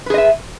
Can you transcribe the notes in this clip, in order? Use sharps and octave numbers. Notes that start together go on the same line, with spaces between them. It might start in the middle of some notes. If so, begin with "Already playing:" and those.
G#4 B4 D#5 E5